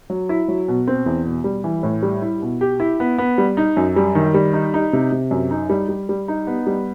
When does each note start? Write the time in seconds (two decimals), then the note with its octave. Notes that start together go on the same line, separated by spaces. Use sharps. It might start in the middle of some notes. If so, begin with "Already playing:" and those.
0.10 F#3
0.29 E4
0.48 F#3
0.68 B2
0.87 C4
1.06 E2
1.25 B2
1.44 G3
1.64 E3
1.83 A2
2.03 G3
2.22 E4
2.42 B2
2.61 G4
2.80 E4
3.00 B3
3.18 B3
3.38 G3
3.57 D#4
3.77 F#2
3.96 G3
4.15 D#3
4.34 G3
4.53 D#4
4.74 D#4
4.93 C3
5.12 C3
5.31 F#2
5.51 D#4
5.70 G3
5.89 G3
6.09 G3
6.28 D#4
6.47 B3
6.67 G3